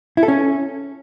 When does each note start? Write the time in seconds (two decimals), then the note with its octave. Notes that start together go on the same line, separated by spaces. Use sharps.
0.17 E4
0.23 A4
0.28 C#4